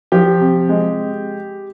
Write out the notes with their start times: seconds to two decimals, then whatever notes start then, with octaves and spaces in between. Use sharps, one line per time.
0.12 F3 G4
0.41 C3
0.69 G#3